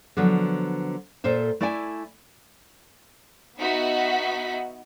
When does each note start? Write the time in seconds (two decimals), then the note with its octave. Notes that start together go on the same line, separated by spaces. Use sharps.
0.17 D3 F3 F#3 B3
1.24 A#2 A4 C5 E5
1.61 A3 E4 D5 E5 F#5 G#5
3.58 B3 D#4 F#4 E5 F#5 B6